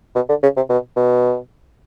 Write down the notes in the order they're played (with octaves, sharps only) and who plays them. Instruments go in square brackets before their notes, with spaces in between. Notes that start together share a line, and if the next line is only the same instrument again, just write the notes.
[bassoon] B2
D3
C#3
C3
B2
B2